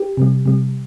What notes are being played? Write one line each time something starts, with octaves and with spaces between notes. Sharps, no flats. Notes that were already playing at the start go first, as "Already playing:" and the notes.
Already playing: G4
C3 G3
C3 G3